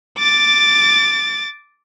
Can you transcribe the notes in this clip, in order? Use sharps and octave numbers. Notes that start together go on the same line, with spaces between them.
D6 A6